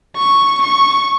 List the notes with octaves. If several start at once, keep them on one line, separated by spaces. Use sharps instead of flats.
C#6
C#6